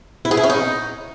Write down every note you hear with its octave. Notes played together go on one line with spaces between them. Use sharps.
E4
G#4
E4
C#4
D#4